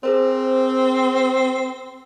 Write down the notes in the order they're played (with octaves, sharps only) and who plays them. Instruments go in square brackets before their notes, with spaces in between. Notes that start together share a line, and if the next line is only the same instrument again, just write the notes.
[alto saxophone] C4 [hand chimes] G#4 A#4 C5